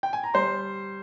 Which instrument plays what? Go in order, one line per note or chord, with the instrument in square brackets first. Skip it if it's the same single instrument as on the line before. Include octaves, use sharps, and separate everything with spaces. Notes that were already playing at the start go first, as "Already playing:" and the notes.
[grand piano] G5
G#5
A#5
G3 C5 C6